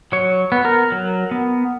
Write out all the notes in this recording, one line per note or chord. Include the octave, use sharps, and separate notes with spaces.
F#3 C#5
B3
A#4
F#3
B3